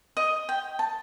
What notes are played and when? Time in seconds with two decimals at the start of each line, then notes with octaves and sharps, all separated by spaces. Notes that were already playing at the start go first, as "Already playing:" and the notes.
0.17 D#5
0.49 G5
0.79 A5